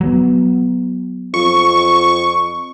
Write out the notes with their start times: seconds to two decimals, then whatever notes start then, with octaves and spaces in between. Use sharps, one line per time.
0.01 F#3 B3
1.34 F2 C#6